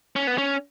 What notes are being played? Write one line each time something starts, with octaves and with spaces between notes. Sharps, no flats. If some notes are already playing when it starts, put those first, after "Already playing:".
C#4
B3
C#4